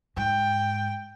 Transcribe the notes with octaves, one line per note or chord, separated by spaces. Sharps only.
G#2 G5